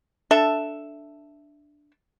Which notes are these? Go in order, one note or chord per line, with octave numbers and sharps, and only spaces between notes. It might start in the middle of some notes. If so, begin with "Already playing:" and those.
D4 A4 E5